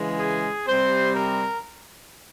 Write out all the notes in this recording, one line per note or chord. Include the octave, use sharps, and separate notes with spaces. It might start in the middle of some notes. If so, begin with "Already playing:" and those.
Already playing: C#3 E3 G#3
G#4
C3 G3 C4 C5
A#4